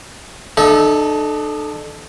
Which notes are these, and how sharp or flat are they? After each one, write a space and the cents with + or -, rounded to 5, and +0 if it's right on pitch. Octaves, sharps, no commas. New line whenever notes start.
D4 +45 A4 -15 D#5 +30